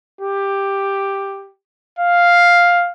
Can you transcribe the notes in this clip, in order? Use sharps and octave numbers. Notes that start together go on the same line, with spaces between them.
G4
F5